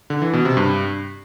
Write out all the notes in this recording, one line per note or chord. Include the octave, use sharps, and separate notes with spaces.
D3
E3
B2
C3
G2